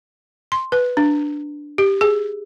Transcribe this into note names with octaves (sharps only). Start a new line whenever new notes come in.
C6
B4
D4
G4
G#4